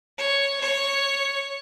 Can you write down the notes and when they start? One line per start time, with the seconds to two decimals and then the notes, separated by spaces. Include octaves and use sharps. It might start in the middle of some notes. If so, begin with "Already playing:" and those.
0.18 C#5
0.61 C#5